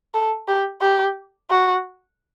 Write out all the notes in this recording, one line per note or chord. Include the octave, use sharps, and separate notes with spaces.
A4
G4
G4
F#4